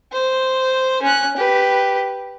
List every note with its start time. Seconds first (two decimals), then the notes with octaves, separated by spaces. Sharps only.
0.12 C5
1.02 C#4 F#6
1.37 G4 B4